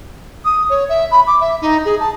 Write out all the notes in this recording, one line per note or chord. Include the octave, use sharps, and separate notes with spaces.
D#6
C#5
E5
B5
D6
E5
D#4
G#4
A5